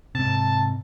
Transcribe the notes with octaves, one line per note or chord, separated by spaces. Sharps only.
G#2 C3 A5